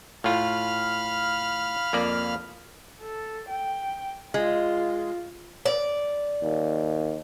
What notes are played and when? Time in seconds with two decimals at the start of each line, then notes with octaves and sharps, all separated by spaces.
0.24 A2 F4 F5 B5 F6
1.93 F2 A#3 D5
3.01 A4
3.49 G5
4.34 G#3 F4
5.66 D5
6.43 D#2